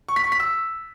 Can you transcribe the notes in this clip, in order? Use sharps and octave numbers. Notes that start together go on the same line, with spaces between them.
C#6
B6
C#6
B6
E6